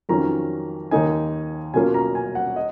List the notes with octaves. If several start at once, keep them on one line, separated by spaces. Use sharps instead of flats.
F2 D#3 F#3 C#4 F4 A#5
D#2 D#3 A#3 D#4 G#5
B2 F#3 A#3 C#4 F4 G#5
A#5
G#5
F#5
D#5